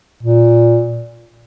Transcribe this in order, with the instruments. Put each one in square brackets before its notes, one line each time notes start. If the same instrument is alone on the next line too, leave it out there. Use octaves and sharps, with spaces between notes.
[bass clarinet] A#2